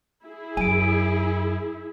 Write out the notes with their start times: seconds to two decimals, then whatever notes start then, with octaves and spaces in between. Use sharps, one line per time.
0.24 E4 G#4
0.57 F#2 G#5 D7